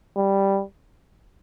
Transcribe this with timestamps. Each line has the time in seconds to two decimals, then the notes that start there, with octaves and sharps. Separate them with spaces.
0.17 G3